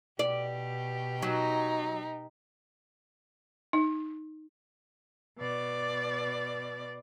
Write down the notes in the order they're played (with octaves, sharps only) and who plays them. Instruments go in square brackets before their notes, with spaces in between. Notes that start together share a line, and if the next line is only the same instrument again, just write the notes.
[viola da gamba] B2 G4 [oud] D5
[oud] F#3 [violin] D#4
[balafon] D#4
[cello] B2 D5